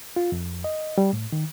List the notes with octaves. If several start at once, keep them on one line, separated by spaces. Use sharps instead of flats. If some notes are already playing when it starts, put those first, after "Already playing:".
F4
F2
D#5
G3
A2
D#3